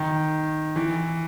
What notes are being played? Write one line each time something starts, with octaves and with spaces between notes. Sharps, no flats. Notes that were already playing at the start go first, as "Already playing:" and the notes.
Already playing: D#3
E3